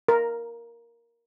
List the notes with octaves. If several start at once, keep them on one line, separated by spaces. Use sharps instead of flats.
A#4